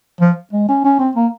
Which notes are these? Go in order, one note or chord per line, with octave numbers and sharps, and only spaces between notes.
F3
G#3
C#4
C#4
C4
A#3